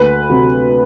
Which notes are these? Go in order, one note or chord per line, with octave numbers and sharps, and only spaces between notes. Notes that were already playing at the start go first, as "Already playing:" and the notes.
Already playing: D2 B4
C3 F#3